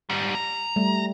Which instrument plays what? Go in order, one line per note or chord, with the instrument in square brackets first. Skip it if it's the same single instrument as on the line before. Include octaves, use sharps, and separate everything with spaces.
[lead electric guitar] G#2 G3
A#5
[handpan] G3 A3